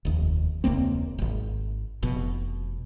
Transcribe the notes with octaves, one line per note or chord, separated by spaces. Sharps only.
F1 D#2
E1 C#2 A#3 C4
D1 G#1
F1 B2